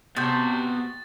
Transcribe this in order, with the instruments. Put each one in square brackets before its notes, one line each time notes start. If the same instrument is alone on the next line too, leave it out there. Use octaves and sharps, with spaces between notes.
[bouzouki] C3 [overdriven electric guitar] B3 A5 [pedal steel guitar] F#4 G6 [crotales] A6